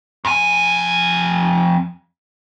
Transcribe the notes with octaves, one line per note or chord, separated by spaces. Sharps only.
F2 G#5